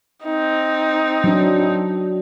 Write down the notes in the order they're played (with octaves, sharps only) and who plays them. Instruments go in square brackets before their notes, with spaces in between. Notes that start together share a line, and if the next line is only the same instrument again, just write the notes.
[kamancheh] C4 D#4
[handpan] F#3 D4